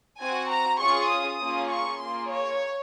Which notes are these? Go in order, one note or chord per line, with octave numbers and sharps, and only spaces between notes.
C4 F#4 G#5
A#5
C#4 F4 G#4 C#6
D#6
A#3 C#4 F4 G#4
C#6
A#3 F4 G#4 C6
C#5